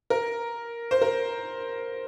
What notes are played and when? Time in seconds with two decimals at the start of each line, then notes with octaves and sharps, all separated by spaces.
0.10 A#4
0.91 C5
1.02 A#4